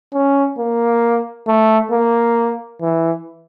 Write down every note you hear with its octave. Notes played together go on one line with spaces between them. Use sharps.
C#4
A#3
A3
A#3
E3